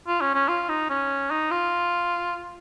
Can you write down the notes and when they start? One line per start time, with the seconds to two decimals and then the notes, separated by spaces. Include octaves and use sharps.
0.07 F4
0.21 C#4
0.34 C#4
0.48 F4
0.69 D#4
0.90 C#4
1.30 D#4
1.51 F4